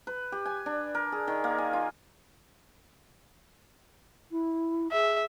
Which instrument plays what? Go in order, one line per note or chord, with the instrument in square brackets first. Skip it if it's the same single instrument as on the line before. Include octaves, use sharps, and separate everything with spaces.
[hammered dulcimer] B4
G4
G#5
D4
A#4
G#4
D#3
A#3
G#5
F4
[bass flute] E4
[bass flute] G#4 [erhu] E5